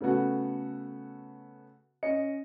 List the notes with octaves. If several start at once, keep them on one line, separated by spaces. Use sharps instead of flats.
C#3 A3 B3 F#4 A4
C#4 D#5 C#7